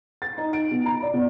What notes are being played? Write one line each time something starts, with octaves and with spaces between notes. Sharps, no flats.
A6
D#4
D7
B2
A#5
D5
B2